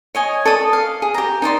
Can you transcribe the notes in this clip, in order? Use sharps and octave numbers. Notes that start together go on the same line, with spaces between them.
C#5 D#5 G#5
A4 D5 D#6
F5
G#4
G4 A#5
D#4 C5 D5 C6